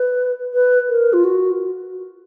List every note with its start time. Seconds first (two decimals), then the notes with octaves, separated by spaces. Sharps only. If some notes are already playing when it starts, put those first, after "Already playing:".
Already playing: B4
0.54 B4
0.89 A#4
1.13 F4
1.24 F#4